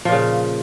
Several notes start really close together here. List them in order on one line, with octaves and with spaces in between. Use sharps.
F3 A#2 C#3